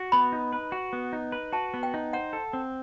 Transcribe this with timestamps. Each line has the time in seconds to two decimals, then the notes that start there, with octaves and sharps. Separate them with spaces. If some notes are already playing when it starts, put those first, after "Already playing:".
Already playing: F#4
0.12 B3 B5
0.32 D#4
0.53 B4
0.72 F#4
0.93 B3
1.13 D#4
1.32 B4
1.52 F#4 A5
1.74 B3
1.83 G5
1.94 D#4
2.13 C5 F#5
2.33 A4
2.53 C4